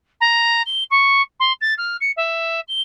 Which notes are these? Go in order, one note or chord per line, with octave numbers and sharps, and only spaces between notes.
A#5
G7
C#6
C6
A6
F6
C#7
E5
G7